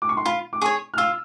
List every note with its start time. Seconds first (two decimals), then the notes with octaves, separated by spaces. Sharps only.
0.02 D6
0.09 C#6
0.17 C6
0.25 F4 B5
0.53 D6
0.61 G#4 C#5 C#6
0.94 F6
0.98 F4 E6